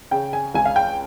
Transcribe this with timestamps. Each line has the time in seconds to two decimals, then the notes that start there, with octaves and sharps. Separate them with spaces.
0.11 C#3 G5
0.33 G#5
0.54 C#2 G#5
0.66 F5
0.76 G5